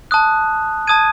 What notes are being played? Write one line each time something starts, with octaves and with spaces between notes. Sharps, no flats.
A5 D#6 F#6
A5 D#6 G#6 D#7